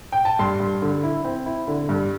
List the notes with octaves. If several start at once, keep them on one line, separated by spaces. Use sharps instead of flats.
G5
A5
G2 C6
G2
D3
E4
C4
E4
D3
G2